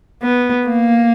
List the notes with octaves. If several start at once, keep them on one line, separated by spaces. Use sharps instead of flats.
B3
A#3